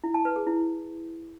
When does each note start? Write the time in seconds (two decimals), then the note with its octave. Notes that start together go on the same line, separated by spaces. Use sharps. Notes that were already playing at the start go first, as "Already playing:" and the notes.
0.04 E4
0.14 A5
0.25 B4
0.36 G#4
0.47 E4